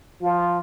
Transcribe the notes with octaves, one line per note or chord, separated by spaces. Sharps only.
F3